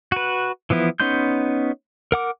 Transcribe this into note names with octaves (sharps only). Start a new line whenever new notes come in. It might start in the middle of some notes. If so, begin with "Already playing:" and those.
F#4 B4
E3 F3 B3 E4
B3 C#4 D#4 C6 G6
A#4 F#5 D6